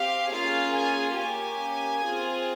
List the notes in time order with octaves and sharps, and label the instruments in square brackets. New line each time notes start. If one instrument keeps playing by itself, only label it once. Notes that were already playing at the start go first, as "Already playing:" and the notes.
Already playing: [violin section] C4 G4 F5
A#3 C#4 F4 G#4 F5
G#5
A#3 C#4 G4 G#5
C4 F4 G#4